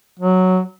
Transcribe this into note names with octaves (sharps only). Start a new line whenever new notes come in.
F#3